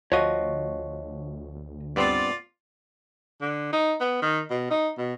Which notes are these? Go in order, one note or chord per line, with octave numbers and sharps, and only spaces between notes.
D2 F3 F#4 C#5 D#5
G2 B3 C4 F4 D5
D3
D#4
B3
D#3
B2
D#4
B2